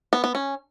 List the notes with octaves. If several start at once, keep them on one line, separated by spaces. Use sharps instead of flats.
B3
B3
C#4